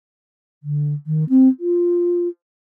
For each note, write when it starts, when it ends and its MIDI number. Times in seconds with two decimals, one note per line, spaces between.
0.63 0.94 50
1.07 1.24 51
1.29 1.48 60
1.60 2.28 65